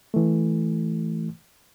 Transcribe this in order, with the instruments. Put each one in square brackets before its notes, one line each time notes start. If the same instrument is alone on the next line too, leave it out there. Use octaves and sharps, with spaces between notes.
[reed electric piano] E3 A3